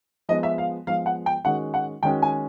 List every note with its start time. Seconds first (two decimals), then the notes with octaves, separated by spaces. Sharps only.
0.29 F3 G#3 B3 D#5
0.43 E5
0.58 F5
0.87 F3 G#3 B3 F5
1.06 F#5
1.26 G5
1.45 D#3 G#3 C#4 F#4 F#5
1.74 F#5
2.03 D#3 G#3 C#4 F#4 G5
2.22 G#5